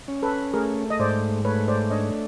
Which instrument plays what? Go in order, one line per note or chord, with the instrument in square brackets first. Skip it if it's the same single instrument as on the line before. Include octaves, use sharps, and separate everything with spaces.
[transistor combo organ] C#4
[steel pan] A4 B4
[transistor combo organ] A3 [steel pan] G#4 A#4
[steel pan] D#5
[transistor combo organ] G#2 [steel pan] C5 D5
[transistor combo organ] A3 [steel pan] B4 C#5
[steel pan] C5 D5
[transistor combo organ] D4 [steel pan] C#5 D#5